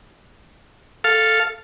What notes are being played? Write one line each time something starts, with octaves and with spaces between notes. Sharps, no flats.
A4 F5